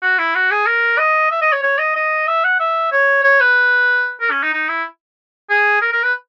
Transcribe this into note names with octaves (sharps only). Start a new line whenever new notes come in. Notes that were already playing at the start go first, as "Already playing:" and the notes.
F#4
E4
F#4
G#4
A#4
D#5
E5
D#5
C#5
C#5
D#5
D#5
E5
F#5
E5
C#5
C#5
B4
A#4
C#4
D#4
D#4
E4
G#4
A#4
A#4
B4